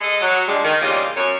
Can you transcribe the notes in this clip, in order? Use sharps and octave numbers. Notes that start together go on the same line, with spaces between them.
G#3 A4 D#5
F#3
D3 F3 G3 G#3
D#3
E2 A#2 C#3 G3 F4 D#5
F#2 C#5